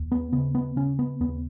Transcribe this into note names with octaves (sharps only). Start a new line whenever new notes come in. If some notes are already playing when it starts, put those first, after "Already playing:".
Already playing: D#2
B3
C#3 B3
B3
C#3 C#4
B3
D#2 B3